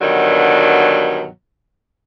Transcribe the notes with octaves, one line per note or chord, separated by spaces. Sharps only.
G2 B2 D3 D#3 F#3